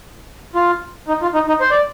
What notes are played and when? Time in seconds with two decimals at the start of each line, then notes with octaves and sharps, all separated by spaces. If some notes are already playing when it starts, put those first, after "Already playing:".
0.55 F4
1.08 D#4
1.22 F4
1.34 D#4
1.48 D#4
1.61 C5
1.70 D5